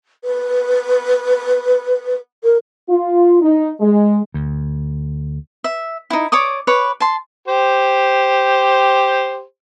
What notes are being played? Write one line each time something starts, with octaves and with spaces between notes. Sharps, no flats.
B4
A#4
F4
D#4
G#3
D2
E5
D#4 E4
C#5 D5 D6 D#6
B4 C#5 D6
A5 C6
G4 C5